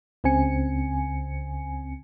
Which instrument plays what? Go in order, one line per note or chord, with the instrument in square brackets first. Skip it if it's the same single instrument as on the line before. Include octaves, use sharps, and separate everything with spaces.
[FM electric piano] C#2 C#3 C4 G#5 C#7